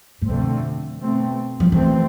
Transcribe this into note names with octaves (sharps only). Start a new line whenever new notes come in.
A2
F2 B2 D3 A3 C4
B2 A3 C4
F3
B2 E3 A3 C4